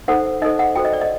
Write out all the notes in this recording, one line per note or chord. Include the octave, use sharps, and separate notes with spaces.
D#4 A4 C5 F#5
D#4 A4 C5 D#5
F#5
F#4 A4 C5 G5
D#5
D5
D#5